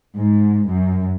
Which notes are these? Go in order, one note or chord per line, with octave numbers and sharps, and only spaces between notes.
G#2
F#2